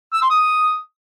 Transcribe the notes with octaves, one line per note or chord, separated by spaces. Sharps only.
E6
C6
D#6